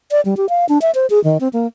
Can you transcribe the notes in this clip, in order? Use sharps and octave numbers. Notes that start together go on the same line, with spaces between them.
D5
G3
G4
F5
D4
E5
C5
G#4
D#3
C4
A#3